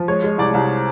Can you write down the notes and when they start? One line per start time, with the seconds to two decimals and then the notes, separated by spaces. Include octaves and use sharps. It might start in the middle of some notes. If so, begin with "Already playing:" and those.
Already playing: F3
0.08 G#3 C#5
0.24 G#3
0.38 C2 D5
0.54 C2